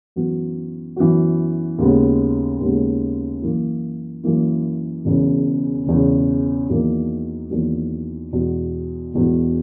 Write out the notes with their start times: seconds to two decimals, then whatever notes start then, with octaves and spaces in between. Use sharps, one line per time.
0.16 F#2 E3 B3 F#4
0.96 F#2 E3 B3 F#4
1.78 D#2 C#3 G#3 B3
2.60 D#2 C#3 G#3 B3
3.42 F#2 E3 A#3 E4
4.23 F#2 E3 A#3 E4
5.05 E1 E2 C#3
5.87 E1 E2 C#3
6.69 E2 D#3 F#3 A#3
7.50 E2 D#3 F#3 A#3
8.32 E1 E2 B2
9.14 E1 E2 B2